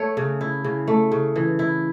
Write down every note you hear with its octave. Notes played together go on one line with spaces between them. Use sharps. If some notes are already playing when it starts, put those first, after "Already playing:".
Already playing: A3 C#5
C#3
E4
C#3
A3
C#3
E3
E4